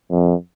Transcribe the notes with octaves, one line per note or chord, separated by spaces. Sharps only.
F2